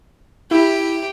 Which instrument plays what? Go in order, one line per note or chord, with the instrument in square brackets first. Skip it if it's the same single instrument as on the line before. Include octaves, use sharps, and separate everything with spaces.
[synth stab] E4 [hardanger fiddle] G4